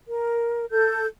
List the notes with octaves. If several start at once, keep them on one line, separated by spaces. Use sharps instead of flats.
A#4
A4 G6